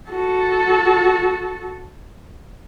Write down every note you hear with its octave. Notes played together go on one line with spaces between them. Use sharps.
F#4 A4